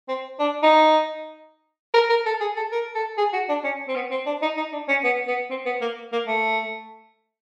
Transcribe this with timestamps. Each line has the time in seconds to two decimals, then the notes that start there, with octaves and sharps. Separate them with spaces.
0.09 C4
0.39 D4
0.63 D#4
1.94 A#4
2.09 A#4
2.26 A4
2.40 G#4
2.57 A4
2.72 A#4
2.95 A4
3.18 G#4
3.33 F#4
3.49 D4
3.64 C#4
3.88 C4
3.96 B3
4.11 C4
4.26 D4
4.42 D#4
4.57 D#4
4.73 D4
4.88 C#4
5.04 B3
5.28 B3
5.50 C4
5.66 B3
5.81 A#3
6.12 A#3
6.27 A3